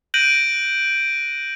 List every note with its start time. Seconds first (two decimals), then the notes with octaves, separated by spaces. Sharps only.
0.14 F#6 G6 A#6 D7 D#7 F#7